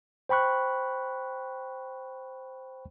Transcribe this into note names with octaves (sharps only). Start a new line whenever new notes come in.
C5 G5 B5 C#6 F#6